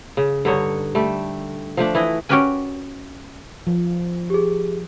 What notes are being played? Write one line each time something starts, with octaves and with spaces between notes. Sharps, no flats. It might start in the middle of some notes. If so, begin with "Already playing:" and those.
C#3
G2 D3 D#4 C#5
G3 A3
F3 A3 D4
E3 E4 D#5
C#4 F#4 G4 A#4 B4 G#5
F3
G4 G#4